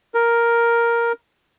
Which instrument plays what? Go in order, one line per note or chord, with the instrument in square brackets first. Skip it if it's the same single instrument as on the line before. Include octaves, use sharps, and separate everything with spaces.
[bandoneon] A#4